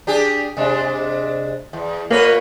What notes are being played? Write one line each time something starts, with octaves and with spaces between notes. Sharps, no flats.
D4 G4 G#4
C3 G#3 D4
E2
A#2 A#3 B4 C#5